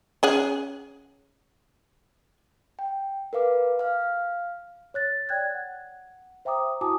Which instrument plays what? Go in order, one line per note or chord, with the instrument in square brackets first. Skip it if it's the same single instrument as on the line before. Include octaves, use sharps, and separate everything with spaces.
[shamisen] C#4 G#4 F#5
[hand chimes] G5
A#4 B4 F5 D6
F5 F6
[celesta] C#5 F#6 A6
D5 G5 F#6 G#6
F#5
C5 E5 G5 A#5 D6 D#6
E4 F#4 G#5 A5 D6 D#6